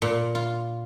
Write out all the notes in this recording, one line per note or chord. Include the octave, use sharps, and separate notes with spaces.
A#2
F4